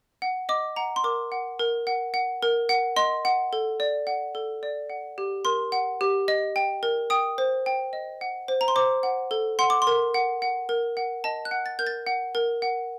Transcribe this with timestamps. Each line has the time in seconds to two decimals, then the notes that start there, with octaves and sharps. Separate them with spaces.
0.22 F#5
0.49 D#5 D6
0.76 F#5 A#5
0.96 C6
1.04 A#4 D6
1.32 F#5
1.59 A#4
1.87 F#5
2.14 F#5
2.43 A#4
2.69 F#5
2.96 D#5 C6
3.25 F#5
3.53 A4
3.80 D5
4.07 F#5
4.35 A4
4.63 D5
4.90 F#5
5.18 G4
5.45 A#4 C6
5.72 F#5
6.01 G4
6.28 D#5
6.56 G5
6.83 A#4
7.10 G5 D#6
7.38 C5
7.66 G5
7.93 D#5
8.21 F#5
8.48 C5
8.61 A#5
8.68 C6
8.76 C5 D6
9.03 F#5
9.31 A4
9.59 F#5 C6
9.70 D6
9.82 C6
9.87 A#4
10.14 F#5
10.42 F#5
10.69 A#4
10.97 F#5
11.24 D#5 A5
11.45 F#6
11.51 F#5
11.66 A6
11.79 A#4 G6
11.87 A6
12.07 F#5
12.35 A#4
12.62 F#5